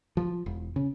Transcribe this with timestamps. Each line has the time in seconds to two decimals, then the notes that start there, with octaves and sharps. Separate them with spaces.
0.17 F3
0.46 E1
0.76 C#3